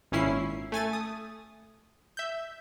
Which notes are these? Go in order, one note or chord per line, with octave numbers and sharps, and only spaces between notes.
G#1 A#2 C#4 E4 C7
A3 G#5 A6 D#7
D#6
E5 G6